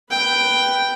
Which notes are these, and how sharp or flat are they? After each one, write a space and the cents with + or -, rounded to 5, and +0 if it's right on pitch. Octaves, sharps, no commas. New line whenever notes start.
B4 +0 G5 +0